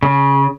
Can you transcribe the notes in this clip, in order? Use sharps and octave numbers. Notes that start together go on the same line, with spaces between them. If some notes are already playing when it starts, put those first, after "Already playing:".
C#3